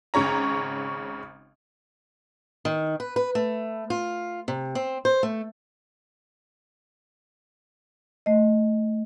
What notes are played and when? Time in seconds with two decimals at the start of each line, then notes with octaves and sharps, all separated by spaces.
0.14 G#1 C#3 C#5 A#5
2.65 D#3
3.00 B4
3.16 B4
3.35 A3
3.90 F4
4.48 C3
4.75 C4
5.05 C5
5.23 A3
8.26 A3 D#5